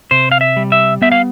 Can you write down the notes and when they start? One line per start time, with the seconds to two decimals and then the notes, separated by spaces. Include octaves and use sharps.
0.11 C3 C5
0.31 F5
0.41 E5
0.57 G3
0.72 E5
1.02 B3 E5
1.12 F5